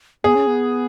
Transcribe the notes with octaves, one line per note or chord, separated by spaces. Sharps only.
B3 G#4
C#4
B3